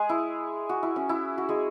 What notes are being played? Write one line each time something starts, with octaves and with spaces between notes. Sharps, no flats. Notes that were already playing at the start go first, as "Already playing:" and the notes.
Already playing: G#3 G#4
E4
F#4
E4
C#4
E4
F#4
G#3 G#4